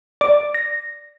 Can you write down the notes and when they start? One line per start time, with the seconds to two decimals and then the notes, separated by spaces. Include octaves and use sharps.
0.21 D5
0.54 A#6